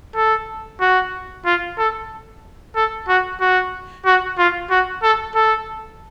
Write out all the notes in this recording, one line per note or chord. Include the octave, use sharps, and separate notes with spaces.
A4
F#4
F4
A4
A4
F#4
F#4
F#4
F4
F#4
A4
A4